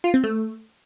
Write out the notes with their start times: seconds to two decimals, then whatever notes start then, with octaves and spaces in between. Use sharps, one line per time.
0.04 F4
0.14 C4
0.24 A3